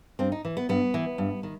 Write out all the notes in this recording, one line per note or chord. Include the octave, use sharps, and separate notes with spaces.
G2 C4
D#4
E3
B3
G2 B3
E3
G2
D#3